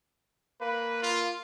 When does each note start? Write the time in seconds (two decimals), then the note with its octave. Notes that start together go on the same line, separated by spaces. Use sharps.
0.61 A#3 B4
1.03 F4